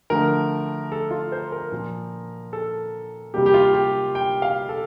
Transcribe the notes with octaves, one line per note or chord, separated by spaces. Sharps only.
D3 F3 A3 A#4
A4
F4
C5
A#4
A#2 F3 A#3
A4
C3 G3 A#3 G4
G4
F4
G4
G5
F5
A4